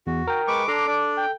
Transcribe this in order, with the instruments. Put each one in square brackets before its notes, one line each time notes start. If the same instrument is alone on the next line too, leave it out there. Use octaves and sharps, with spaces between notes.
[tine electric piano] E2 [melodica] F#4
[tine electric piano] A#4 G5
[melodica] G#3 B4 C#6 [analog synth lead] D6
[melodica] D4 A#5 C6 [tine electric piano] A4
[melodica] D4 D5
[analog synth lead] G5